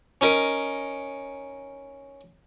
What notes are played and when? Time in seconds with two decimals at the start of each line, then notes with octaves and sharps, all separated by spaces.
0.21 C#4 D#4 A#4